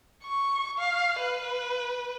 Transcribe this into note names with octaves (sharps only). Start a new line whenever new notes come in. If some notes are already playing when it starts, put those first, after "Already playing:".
C#6
F5
B4